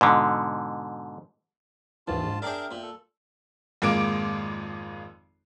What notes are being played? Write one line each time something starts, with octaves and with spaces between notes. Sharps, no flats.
G#2 B2 D3
A#1 D#2 G#2 E3 F4 A5
G#2
D4 G#4 A#4 D5 E5 G5
A#2
A4
G#1 F2 G#3 A#3 D6 D7